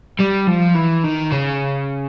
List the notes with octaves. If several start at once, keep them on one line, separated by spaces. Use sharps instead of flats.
G3
F3
E3
D#3
C#3